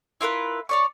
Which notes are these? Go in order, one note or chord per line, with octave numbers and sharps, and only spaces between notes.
E4 F4 A#4 B4
C#5 D5 C#6